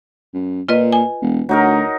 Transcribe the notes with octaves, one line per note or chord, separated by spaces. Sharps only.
F#2
A#2 F4 B4 D#5
G#5
E1
D2 F#3 D#4 A#4